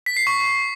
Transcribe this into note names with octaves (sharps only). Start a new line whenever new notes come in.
B6
C7
C#6